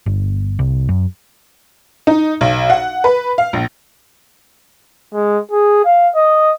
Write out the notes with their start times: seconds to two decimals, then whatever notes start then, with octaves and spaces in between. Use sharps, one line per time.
0.06 G1
0.59 C2
0.89 F#2
2.07 D#4
2.41 B1
2.70 F#5
3.04 B4
3.38 F5
3.53 A#1
5.14 G#3
5.51 G#4
5.85 F5
6.15 D#5